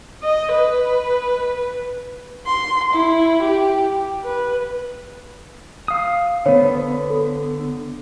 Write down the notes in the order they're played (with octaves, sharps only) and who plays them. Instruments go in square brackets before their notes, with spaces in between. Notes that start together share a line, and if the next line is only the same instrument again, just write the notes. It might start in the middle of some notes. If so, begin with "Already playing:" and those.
[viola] D#5
B4
[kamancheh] C6
E4
G4
B4
[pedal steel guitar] F5 D#6
[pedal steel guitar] D3 B3 [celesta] C5 C#5
[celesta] A4